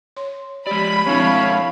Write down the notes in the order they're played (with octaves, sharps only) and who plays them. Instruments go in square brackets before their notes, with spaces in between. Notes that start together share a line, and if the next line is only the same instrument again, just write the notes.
[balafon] C#5 C6
[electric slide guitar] G#3 D5 [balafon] G4 [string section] B5
[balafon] F3 C4 D4 [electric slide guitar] G#3 E4 [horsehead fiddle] C#5 F5